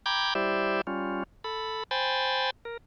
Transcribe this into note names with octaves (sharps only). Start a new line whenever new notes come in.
G5 A#5 B5 D6 G6 G#6
G3 E4 G4 C5 D5 E5
G3 C#4 F4
A4 B5
C5 G5 G#5 B5 A6
A#4